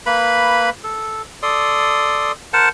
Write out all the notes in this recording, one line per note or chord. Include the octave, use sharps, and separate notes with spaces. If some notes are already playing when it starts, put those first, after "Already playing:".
A#3 B4 B5
A4
A4 D5 C6 D#6
A#4 C5 F#5 A5